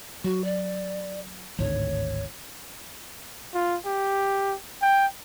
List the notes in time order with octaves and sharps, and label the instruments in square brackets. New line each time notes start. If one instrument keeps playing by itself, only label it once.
[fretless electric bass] F#3 [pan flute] F#4
[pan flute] D5
[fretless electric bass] G#1 D2 A2 [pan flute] C#5
[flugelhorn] F4
G4
G5